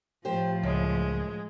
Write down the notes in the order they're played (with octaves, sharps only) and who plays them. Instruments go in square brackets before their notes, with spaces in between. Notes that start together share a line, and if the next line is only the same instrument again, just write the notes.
[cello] A2 F3 [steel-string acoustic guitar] G4 C5
[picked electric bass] C#2 [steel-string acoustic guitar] F#2 [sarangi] G#3